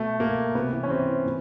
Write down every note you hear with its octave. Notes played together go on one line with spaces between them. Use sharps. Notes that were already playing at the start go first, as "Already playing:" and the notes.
Already playing: B2 A3
B2 A#3
C3 B3
E3
C#4
C3 C4
E3
A#2